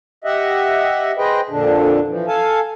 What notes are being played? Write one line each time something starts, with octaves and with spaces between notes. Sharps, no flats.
G4 D#5 E5 F#5
G#4 B4 C5 D#5 G5
F2 A#2 D3 D4
E3 F3
A4 F5 G#5 A5